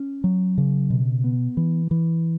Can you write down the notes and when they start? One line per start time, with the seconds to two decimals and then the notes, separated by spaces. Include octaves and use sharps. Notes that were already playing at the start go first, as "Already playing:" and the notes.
Already playing: C#4
0.24 F#3
0.58 C#3
0.90 B2
1.24 B3
1.57 E3
1.91 E3